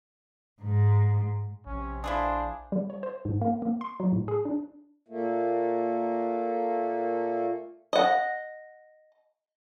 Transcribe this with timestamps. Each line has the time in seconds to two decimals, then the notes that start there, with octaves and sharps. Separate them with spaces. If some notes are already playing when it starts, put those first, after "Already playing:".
0.62 G#2
1.66 A#1 C3 C#4
2.04 D4 E4 F4 G#4 C5
2.72 G3
2.90 C#5
3.03 C5
3.25 G#2
3.41 A#3
3.62 A#3
3.81 C6
4.00 F#3
4.12 A2
4.28 G#4
4.45 D4
5.08 A#2 A3 A#3
7.93 D#5 F#5